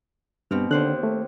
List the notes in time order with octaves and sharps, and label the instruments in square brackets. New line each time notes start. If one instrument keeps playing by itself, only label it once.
[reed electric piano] G2 [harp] B2 C4 F6
[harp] D#2 C5 F#6 [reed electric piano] D3
[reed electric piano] A3